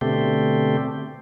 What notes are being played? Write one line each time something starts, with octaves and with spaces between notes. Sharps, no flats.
B2 D3 A3 C4 G4